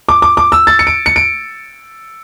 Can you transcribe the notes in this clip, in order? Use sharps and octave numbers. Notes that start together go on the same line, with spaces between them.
D6
D6
D6
E6
A6
C#7
D7
C#7
D7